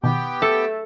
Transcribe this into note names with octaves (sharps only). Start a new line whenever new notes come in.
B2 D#3 B3 G4 G5
A3 A4